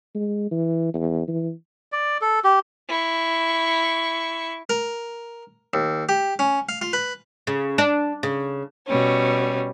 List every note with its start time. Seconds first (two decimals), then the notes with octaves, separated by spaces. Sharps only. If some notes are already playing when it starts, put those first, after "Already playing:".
0.15 G#3
0.51 E3
0.94 E2
1.28 E3
1.92 D5
2.21 A4
2.44 G4
2.88 E4 C#6
4.70 A#4
5.74 D#2
6.09 G4
6.39 C#4
6.69 F5
6.82 F4
6.93 B4
7.47 C#3
7.78 D4
8.23 C#3
8.87 B2 G3 C#4